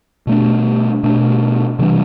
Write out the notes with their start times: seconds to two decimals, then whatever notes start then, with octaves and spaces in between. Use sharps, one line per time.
0.27 B2 A3 D4
1.03 B2 A3 D4
1.79 C3 E3 G3 D4